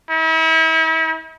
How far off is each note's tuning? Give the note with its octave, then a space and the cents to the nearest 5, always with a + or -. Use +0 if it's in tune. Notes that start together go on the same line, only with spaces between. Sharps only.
E4 -40